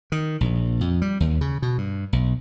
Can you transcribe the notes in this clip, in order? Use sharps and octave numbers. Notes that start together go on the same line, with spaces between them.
D#3
A#1
F2
G3
D#2
C#3
B2
G2
B1